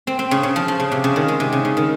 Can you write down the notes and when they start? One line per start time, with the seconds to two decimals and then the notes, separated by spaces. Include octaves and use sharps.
0.07 C4
0.19 C4
0.31 C#3
0.43 C#3
0.56 F3
0.68 F3
0.80 C#3
0.92 C3
1.04 C#3
1.16 D#3
1.28 G#3
1.40 C3
1.52 C#3
1.65 C#3
1.77 D#3